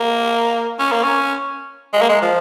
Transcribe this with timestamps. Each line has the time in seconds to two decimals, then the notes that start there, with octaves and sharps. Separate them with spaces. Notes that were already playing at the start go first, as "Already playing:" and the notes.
Already playing: A#3
0.79 C#4
0.92 A#3
1.04 C#4
1.93 G#3
2.01 A#3
2.09 G#3
2.22 F3